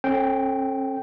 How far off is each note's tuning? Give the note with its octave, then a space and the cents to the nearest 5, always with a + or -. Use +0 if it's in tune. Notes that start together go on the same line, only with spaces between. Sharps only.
C#4 -45 A4 +0 G5 -10